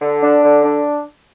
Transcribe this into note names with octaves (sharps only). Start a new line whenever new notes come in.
D3
D4
D3
D4